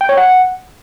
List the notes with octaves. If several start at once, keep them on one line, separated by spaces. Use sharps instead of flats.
G5
C#5
F#5